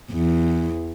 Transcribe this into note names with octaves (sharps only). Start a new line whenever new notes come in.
E2